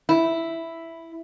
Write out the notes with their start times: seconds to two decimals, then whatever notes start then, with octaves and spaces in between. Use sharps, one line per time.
0.09 E4